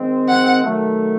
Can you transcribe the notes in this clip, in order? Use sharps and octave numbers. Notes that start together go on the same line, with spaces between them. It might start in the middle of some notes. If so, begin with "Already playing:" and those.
Already playing: D#3 G#3 C4
F#5
D#3 F#3 A3